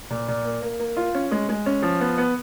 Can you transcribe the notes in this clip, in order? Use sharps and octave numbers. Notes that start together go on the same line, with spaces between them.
A#2
A#2
A#3
A#3
A#3
F4
C#4
G#3
G#3
C#4
F3
B3
B3